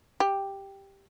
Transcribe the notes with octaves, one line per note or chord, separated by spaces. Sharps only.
G4